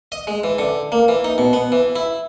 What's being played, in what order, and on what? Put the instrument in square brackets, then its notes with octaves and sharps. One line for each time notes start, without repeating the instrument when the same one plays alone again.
[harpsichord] D#5
G#3
E3
D3
A#3
E3
D#4
B2
B3
E3
E4